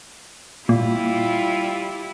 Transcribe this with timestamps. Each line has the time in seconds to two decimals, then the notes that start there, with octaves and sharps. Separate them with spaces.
0.69 A#2 G3 E4 F4